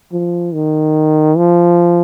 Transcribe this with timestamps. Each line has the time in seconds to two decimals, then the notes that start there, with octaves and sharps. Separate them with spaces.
0.12 F3
0.54 D#3
1.37 F3